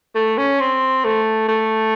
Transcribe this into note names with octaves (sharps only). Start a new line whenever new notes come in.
A3
C#4
C4
A3
A3